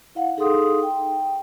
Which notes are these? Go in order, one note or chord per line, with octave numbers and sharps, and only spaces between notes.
E4 F5 F#5
D#4 G#4 A4 F5 C6 D#6
G5